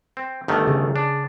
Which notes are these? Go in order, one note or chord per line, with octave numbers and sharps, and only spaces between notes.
C4
G1 D#3 A3
C#3 G#4
D4